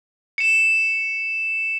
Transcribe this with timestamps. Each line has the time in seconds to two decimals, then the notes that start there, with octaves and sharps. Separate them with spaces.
0.38 C#7 E7